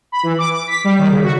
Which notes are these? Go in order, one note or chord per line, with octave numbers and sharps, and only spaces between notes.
B5
E3
D6
D6
B6
G3
D#3
C#3
F#4